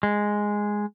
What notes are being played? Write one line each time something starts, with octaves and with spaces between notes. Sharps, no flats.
G#3